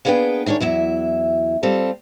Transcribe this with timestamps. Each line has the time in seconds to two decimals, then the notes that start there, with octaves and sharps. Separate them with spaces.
0.05 A#3 B3 D4 G#4 B4 G5
0.46 D2 D#3 D4 G#4 C#5
0.60 E2 F#3 E4 E5
1.63 G3 C4 F4 A4